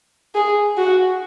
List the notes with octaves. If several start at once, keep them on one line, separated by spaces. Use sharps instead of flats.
G#4
F#4